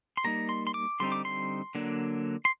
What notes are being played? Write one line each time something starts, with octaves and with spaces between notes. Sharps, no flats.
C6
G3 A#3 D#4 A#5
C6
C6
D6
D3 G3 C4 D#4 C6
D6
C6
D3 F#3 A#3 D4
C6